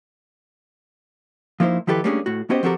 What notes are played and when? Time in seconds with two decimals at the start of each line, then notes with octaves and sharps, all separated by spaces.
1.60 F3 A#3 D#4 E4 C5
1.87 D#3 F3 E4 G4 A4 B4
2.04 G3 A3 A#3 C#4 D4 G#4
2.26 A2 F#4
2.50 B3 C#4 F#4 G4 C5 D#5
2.63 F3 C4 F#4 G4 A4 A#4